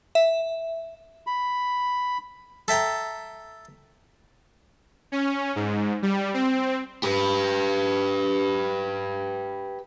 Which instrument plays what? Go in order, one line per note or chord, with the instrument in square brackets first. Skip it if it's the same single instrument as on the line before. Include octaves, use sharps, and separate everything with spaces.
[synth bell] E5
[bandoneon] B5
[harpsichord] A4 E5 G5 A#5
[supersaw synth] C#4
G#2
G3
C4
[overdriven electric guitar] G4 B4